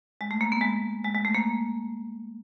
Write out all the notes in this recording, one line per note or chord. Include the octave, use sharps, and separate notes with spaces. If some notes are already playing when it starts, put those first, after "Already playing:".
G#3
A3
A#3
B3
G#3
G#3
G#3
A3
A#3